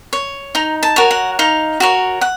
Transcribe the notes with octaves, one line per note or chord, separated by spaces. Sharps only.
C#5
D#4 A#5
A5
F#4 A#4 C#5
F#5
D#4 F5
F#4 A#4 C#5
F#5